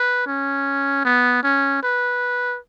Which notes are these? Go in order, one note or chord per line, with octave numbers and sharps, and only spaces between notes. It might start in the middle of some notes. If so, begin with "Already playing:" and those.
Already playing: B4
C#4
B3
C#4
B4